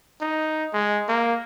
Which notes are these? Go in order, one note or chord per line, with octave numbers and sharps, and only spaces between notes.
D#4
G#3
A#3